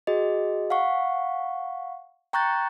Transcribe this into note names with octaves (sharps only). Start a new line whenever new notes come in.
F#4 G#4 D#5
F5 F#5 C#6
G5 A#5 C#6 F#6 G6 A6